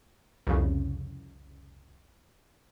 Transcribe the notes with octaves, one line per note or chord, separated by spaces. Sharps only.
C2 F2 C#3